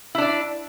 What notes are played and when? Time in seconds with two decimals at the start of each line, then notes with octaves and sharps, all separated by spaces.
0.15 E4
0.18 D4
0.22 D5